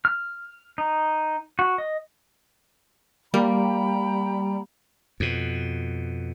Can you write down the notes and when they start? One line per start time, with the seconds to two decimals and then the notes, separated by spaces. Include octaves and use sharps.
0.05 F6
0.78 D#4
1.59 F#4
1.78 D#5
3.34 G3 A#3 G5 A#5 B5
5.20 F2 B2